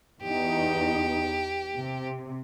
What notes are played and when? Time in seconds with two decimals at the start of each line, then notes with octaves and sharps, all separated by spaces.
0.22 E2 D#4 G4
1.76 C3